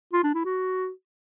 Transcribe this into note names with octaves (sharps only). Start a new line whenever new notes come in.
F4
D4
E4
F#4